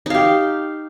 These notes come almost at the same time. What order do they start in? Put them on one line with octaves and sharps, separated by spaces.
D#4 F5 G4